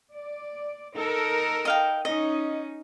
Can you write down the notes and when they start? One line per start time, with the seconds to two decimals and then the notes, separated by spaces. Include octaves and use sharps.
0.13 D5
0.96 D#4 A4 A#4
1.65 D#5 F5 G5
2.05 C#4 D#4 D#5